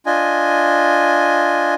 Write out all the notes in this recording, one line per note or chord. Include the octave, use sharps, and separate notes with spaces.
D4 F4 D#5 G#5